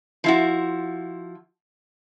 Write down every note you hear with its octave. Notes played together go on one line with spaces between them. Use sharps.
F3 E4 F#4